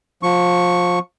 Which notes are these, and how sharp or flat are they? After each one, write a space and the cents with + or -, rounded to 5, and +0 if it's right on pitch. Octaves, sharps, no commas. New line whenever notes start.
F3 +25 C#6 +0